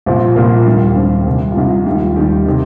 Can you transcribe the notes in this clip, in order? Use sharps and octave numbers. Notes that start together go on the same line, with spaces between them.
C2 A#2 F3 C4
C2 A#2 F3 A#3
D#2 D#3 G3
D#2 D#3 G3 C4
C2 C3 G3
F4
C2 C3 G3 D#4
D#2 D#3 G3 F4
D#2 D#3 G3 G4
C3 D#3